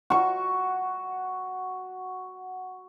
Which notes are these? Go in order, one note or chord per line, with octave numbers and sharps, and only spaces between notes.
F#4 C#6